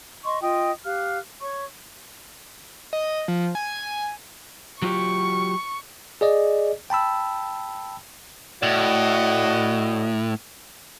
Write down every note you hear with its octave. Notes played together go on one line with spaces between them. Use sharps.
D#5 C6 C#6
F4 D#5 G5 D#6
G4 F5 F6 F#6
C#5 C#6
D#5
F3
G#5
F#3 F4 G4 C#6
G#4 D5 D#5
G5 A5 B5 E6
A2 F#4 D5 D#5